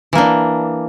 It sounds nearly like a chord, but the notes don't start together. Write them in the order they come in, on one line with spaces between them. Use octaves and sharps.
E3 A#3 D4